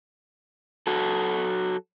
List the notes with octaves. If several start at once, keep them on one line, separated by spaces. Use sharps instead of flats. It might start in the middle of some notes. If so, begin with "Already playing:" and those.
F#3 F#4 A4